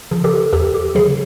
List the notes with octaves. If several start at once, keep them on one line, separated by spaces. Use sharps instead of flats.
C#3 F3
G4 A4
E2 G4 A4
G4
C#3 F#3 G#4